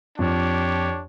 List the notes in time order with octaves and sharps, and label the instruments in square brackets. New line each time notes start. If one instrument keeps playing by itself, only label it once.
[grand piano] F2 [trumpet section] D4 G4 C#5